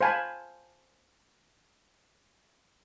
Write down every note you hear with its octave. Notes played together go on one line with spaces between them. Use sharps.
C5 F5 G#5 A5 B5